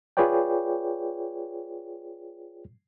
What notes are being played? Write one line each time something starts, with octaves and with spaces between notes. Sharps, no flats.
F4 G#4 B4 C#5 D5 G5